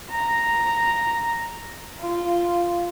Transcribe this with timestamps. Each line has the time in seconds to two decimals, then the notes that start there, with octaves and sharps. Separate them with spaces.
0.11 A#5
1.99 F4